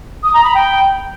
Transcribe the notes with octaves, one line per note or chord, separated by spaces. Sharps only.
D#6
A#5
B5
G5